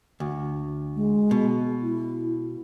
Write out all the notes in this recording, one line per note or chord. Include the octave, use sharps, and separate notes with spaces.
D2
G#3
B2
E4